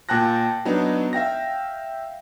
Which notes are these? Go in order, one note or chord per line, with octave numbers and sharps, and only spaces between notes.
A#2 G5 A5 F#6 A#6
F#3 B3 D4 D#4
E5 F5 G5 A#6